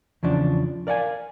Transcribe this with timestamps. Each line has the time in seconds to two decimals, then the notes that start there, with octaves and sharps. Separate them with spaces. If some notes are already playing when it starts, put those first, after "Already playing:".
0.23 E2 C#3 F3 D4
0.87 A#4 D5 F5 F#5 G#5